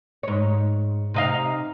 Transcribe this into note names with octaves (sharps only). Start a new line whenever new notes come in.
G#2 C#5
C3 D#4 F5